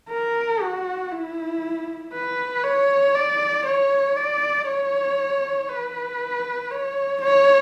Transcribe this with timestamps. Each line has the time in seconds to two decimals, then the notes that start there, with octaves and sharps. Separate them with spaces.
0.10 A#4
0.61 F#4
1.12 E4
2.13 B4
2.64 C#5
3.15 D5
3.66 C#5
4.17 D5
4.67 C#5
5.69 B4
6.71 C#5
7.21 C#5